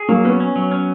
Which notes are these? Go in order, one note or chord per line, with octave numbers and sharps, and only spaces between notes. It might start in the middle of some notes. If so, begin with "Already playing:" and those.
Already playing: G#4
F#3 A#3
B3 C#4
C#4
F#3
C#4